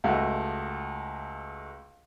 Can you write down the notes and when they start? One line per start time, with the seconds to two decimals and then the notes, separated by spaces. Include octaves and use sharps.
0.04 C#2 A3 F#4